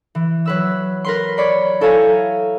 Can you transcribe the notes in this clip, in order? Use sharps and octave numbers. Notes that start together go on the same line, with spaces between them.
E3
F#3 B4 E6
A#4 B4 C6
C#5 D5 B5 C7
E4 A4 C#5 F5 G#5 A#5